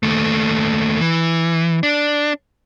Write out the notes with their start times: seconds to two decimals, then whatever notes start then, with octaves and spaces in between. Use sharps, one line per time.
0.03 D#2 A3
1.01 E3
1.83 D4